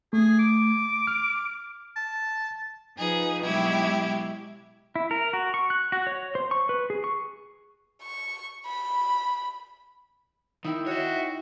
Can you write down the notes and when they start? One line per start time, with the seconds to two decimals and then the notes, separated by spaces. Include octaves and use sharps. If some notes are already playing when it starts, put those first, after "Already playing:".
0.13 A3 G#4
0.39 D6
1.07 F6
1.96 A5
2.96 F3 D#4 G#4 B4
3.45 B2 F#3 G#3 E4 G4 G#6
4.96 E4
5.11 A#4
5.33 F#4
5.54 C#6
5.70 F#6
5.92 F#4
6.07 C#5
6.35 C5
6.51 C#6
6.69 B4
6.90 G#4
7.04 C#6
8.02 C#6
8.67 B5
10.64 D#3 D#4 E4 G5
10.86 F#4 C#5 E5